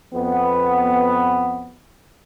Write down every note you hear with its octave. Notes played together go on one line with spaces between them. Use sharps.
F2 B3